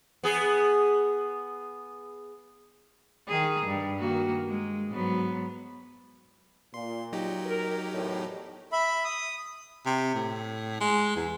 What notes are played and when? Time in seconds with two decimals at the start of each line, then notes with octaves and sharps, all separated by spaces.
0.23 B3 G#4
3.28 D#3 G#4
3.67 G2
3.99 D#3 A#3 F#4
4.47 G#3
4.90 G#2 F#3 B3
6.74 A#2 C6
7.12 F#3 D#4 G4
7.46 A#4
7.93 E2 A2
8.72 E5 B5
9.05 D#6
9.86 C3
10.15 A2
10.80 G#3
11.16 E2